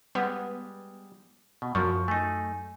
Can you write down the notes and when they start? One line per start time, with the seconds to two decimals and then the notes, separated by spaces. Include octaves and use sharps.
0.15 G3 G#3 B3
1.62 B2
1.75 F#2 F3 C#6
2.08 A3 D#4 G#5